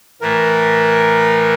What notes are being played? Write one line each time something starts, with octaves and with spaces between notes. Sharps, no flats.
A2 E3 A3 A#4